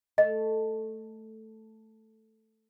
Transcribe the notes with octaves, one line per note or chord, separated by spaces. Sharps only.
A3 D#5